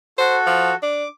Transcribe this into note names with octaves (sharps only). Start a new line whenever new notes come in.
F#4 A4 C5
F3
D4 D6